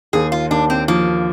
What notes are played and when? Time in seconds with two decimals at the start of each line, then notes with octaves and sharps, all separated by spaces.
0.13 D#2 G#4
0.32 F4
0.51 D#2 D4
0.70 C4
0.88 F3 A#3